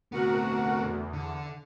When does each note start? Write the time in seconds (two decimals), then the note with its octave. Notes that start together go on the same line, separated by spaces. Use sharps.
0.12 D2 C3 B3 F#4 A#4 F#5
0.79 E2
1.13 D3